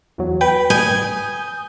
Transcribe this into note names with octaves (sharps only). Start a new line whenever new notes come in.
E2 F#3
B4 G5
G#5 D#6 G6